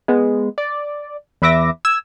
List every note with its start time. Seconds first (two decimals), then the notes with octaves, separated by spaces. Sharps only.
0.08 G#3 B3
0.58 D5
1.42 E2 B4 E5 D6 A#6
1.85 E6 G#6